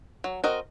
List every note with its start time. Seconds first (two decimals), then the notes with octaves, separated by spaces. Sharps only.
0.24 F#3
0.44 C4 F#4 A#4 D#5